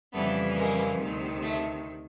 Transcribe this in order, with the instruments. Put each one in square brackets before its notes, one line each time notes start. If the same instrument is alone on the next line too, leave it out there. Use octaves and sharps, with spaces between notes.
[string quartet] F2 C#3 E3 G3 A3 B3
G#3 A#3
D2 C3 D#3
A3